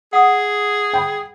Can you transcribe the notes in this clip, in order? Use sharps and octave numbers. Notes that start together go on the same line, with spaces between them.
G#4 F#5 D#6
G5 B5